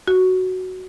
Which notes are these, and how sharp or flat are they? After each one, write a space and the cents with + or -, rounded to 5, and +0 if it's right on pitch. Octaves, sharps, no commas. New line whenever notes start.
F#4 +5